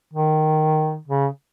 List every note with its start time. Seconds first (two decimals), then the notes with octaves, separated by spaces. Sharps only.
0.13 D#3
1.07 C#3